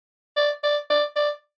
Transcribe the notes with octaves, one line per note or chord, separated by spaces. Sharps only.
D5
D5
D5
D5